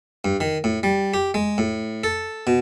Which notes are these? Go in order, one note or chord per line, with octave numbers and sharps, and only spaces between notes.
G2
D#3
A2
G3
G4
G#3
A2
A4
B2